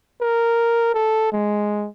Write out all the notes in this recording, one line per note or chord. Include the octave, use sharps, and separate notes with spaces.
A#4
A4
G#3